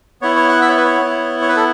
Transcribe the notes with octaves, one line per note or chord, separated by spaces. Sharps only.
B3 E4 C#5
C#5
F#5
E5
C#5
B4
C#5
B3 E4
C#5
B4
A4